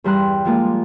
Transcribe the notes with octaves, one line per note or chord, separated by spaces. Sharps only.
E2 G2 G3 A#5 C6 F#6
F3 G#3 A#3 F4 D5